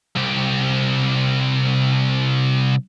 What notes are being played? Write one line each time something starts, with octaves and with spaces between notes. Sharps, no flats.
C2 G4